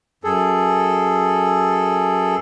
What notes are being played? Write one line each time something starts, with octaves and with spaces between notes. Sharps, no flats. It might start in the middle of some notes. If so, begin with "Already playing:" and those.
F#2 G#4 A4